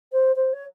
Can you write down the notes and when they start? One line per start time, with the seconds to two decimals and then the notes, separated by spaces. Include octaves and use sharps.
0.12 C5
0.36 C5
0.53 C#5